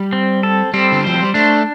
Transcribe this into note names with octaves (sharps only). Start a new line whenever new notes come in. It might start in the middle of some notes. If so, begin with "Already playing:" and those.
Already playing: G3
C4
A4
G3 C4
D3
F3 C5
G3
A3 D4